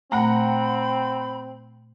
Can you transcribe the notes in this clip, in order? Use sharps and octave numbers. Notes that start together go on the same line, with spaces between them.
A#2 A3 C4 F#5 G5 A#5 B5